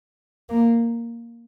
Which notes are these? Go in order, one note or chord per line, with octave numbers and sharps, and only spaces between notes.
A#3